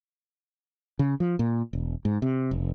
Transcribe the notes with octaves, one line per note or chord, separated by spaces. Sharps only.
C#3
F3
A#2
E1
G#2
C3
F1